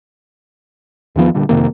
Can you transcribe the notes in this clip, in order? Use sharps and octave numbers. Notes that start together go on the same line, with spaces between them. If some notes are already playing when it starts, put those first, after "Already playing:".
E2 D#3 F3 B3
A#2 D3 G3
F2 C3 D#3 A#3